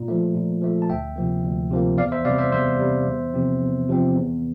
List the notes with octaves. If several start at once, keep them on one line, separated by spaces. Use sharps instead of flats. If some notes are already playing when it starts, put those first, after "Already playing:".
Already playing: A#2
F3 A3
A#2
F3 A3
A5
D2 E5 G5
C3 F3 A#3
D2
C3 F3 A#3
E2 D5 F5
C5 E5
C3 G3 D5 F5
C5 E5
E2 C5 E5
C3 G3
E2
C3 F3 C4
E2
C3 F3 C4
E2